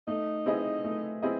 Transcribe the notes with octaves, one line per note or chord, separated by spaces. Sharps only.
A3 D#4
C4 E4 G#4 D#5
A3
C4 E4 G#4 D#5